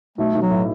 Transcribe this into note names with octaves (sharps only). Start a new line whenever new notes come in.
B1 A3
B1
F#3
A2